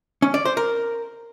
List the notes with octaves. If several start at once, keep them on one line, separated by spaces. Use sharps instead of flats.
C#4
D5
C5
A#4